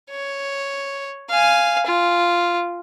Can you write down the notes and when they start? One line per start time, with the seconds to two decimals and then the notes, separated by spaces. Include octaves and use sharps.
0.10 C#5
1.29 F5 G#5
1.86 F4